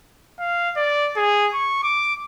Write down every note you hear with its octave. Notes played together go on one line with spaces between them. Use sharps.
F5
D5
G#4
C#6
D6